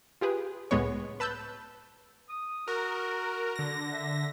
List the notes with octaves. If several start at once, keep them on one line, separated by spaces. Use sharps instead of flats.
F4 G4 G#4 B4
C#2 A2 G#3 B3 C#5
B4 A5 E6 F#6 G6
D#6
F#4 A#4
D3 A#6
E5